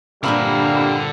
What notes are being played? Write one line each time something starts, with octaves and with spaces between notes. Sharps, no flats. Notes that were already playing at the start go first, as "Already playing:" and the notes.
G2 A#2 D3 G3 A#3 C4 B5